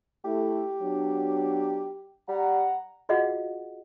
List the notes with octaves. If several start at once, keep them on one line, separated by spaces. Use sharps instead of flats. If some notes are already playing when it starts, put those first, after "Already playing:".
A3 E4 G4
F#3 B3 D4
G3 F#5 A#5
F4 F#4 G#4 D#5 F5 F#5